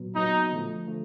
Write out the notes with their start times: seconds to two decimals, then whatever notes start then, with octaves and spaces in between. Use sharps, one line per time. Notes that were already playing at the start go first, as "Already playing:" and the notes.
Already playing: A#2 F#3 B3
0.16 A#2 F#3 B3 D#4
0.51 D3 F3 A3
0.87 D3 F3 A3